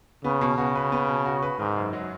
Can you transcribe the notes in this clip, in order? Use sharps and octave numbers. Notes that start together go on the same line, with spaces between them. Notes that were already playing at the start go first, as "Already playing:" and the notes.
C#3 B3
B2
C#3 F#4
B4
B3
B2
F#4
B4
G#2 D#3
F#2
F#3